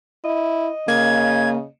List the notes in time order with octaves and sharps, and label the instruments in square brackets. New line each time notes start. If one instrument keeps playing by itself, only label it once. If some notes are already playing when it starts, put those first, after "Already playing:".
[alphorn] E4 [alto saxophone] D#5
[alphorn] C#3 [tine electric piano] A#3 [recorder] G#6